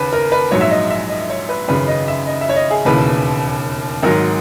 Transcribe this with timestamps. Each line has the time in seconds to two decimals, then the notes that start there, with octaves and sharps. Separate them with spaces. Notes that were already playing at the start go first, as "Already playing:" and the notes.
Already playing: D#2 C#3 B4
0.13 A#4
0.32 B4
0.51 A#1 G#2 F#3 C#5
0.61 E5
0.71 D#5
0.90 E5
1.10 D#5
1.30 C#5
1.49 B4
1.68 G#1 F#2 C#3 B4
1.88 D#5
2.08 E5
2.27 D#5
2.41 E5
2.49 C#5
2.56 D#5
2.71 G#4
2.85 E1 D#2 C#3 E3 B4
4.03 G#1 G#2 F#3 A#4